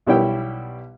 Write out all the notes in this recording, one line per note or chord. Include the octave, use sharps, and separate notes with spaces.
B1 B2 G3 E4 C#5 G5